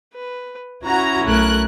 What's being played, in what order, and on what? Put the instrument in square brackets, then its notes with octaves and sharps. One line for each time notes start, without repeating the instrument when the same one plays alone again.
[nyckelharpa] B4
[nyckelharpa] C#4 E4 [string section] F#4 A#5
[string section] B1 F#6 [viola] A3 A#4